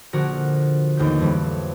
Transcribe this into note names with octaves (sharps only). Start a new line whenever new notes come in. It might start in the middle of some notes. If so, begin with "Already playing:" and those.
A#1 D3 F#4 A#4
A1 D#2 A#4 G6
F2 E3 G3